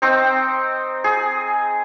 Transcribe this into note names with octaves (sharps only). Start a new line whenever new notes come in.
C4 D#4 G5
G#4